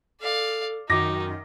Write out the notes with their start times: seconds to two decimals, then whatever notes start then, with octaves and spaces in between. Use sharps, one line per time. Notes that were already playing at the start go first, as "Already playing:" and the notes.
0.21 A4 D5 F5
0.90 F#2 D#3 D#4 F#4 D6 A#6